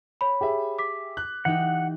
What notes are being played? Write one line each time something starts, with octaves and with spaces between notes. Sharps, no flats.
C#5 B5
G4 G#4 E5
D6 B6
F#6
E3 D#4 G4 F#5